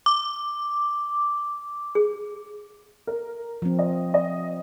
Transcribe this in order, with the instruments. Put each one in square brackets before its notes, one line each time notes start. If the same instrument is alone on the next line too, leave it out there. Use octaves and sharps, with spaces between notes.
[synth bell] D6
[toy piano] G#4
[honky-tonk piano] A#4
[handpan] F3 C4
[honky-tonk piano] D#5
D#5